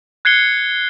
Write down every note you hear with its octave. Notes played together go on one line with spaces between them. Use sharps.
F#6 G#6 C7 C#7 G7